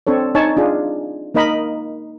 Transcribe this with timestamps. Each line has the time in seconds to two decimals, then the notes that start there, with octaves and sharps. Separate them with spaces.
0.07 C4 D4 A4 C#5
0.35 D#4 C#5 G#5 A5
0.57 D4 F4 G#4
1.34 A#3 D#4 A#4 D#5 B5